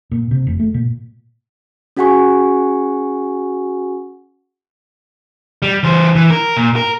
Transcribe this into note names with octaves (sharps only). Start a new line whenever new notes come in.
A#2
C3
F1
A3
A#2
C#4 F#4 G#4 F#5 G#5 C#6
G3
E3 C5
E3
A#4
A#2
A#4